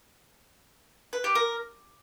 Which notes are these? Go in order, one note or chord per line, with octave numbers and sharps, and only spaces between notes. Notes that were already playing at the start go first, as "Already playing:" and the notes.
B4
G4
A#4